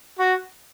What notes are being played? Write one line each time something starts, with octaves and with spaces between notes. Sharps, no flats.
F#4